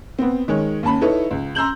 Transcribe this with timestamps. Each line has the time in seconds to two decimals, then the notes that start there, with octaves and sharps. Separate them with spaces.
0.19 B3 C4
0.48 D#3 G#3 C#5
0.83 D#2 C#4 A5 B5
1.01 D#4 E4 A4 B4 C#5
1.31 C#2
1.55 A#5 C6 E6 G6 F#7